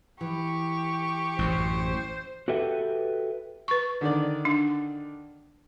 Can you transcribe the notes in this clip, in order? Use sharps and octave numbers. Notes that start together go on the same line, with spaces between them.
E3 G4 C#6
A1 F#2 C5
F#4 G4 A4 B4 E5 G5
B4 C#6
D3 D#3 D5
D4